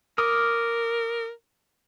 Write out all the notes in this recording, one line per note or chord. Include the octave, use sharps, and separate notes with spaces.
A#4 D6 D#6 F6